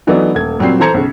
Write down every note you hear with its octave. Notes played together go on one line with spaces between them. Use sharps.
E3 F#3 A3 B3 D4 D#4
D#1 A3 G#6
A#2 F#3 G3 C4 C7
E3 A4 C5 A#5 G#6 C#7
B1 C#3